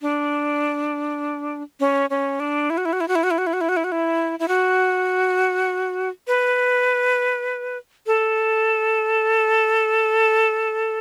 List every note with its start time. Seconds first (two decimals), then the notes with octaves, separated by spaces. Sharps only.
0.02 D4
1.80 C#4
2.10 C#4
2.40 D4
2.70 E4
2.78 F#4
2.85 E4
2.93 F#4
3.01 E4
3.08 F#4
3.15 E4
3.23 F#4
3.31 E4
3.38 F#4
3.47 E4
3.53 F#4
3.61 E4
3.69 F#4
3.77 E4
3.84 F#4
3.92 E4
4.39 E4
4.48 F#4
6.27 B4
8.07 A4